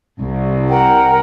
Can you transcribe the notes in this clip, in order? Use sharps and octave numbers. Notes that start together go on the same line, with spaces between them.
C2
A#4 F#5 G5